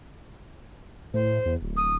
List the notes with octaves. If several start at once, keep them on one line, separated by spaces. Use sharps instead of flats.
A2 C5
E2
D1
D#6